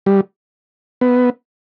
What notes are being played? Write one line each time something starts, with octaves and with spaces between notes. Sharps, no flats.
G3
B3